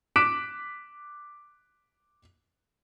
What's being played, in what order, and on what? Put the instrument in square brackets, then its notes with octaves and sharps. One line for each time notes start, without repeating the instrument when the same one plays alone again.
[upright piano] D6 F#6 B6 D7 E7